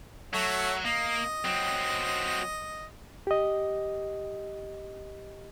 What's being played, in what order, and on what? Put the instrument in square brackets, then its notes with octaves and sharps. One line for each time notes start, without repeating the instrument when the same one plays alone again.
[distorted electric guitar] F#3 [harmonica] A3 C#5 E5
[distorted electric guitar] A#3 [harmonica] D#5
[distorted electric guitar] F#3 C4
[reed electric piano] G4 D#5